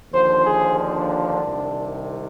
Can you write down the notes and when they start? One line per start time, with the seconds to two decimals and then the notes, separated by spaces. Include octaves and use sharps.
0.13 D#2 D3 F3 C5
0.45 G#4
0.78 D4
1.44 C2 C3 D#3